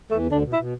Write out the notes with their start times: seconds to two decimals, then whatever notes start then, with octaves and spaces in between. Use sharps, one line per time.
0.11 E2 E3 A3
0.27 D2 D3 D4
0.42 B2
0.53 E4
0.57 B2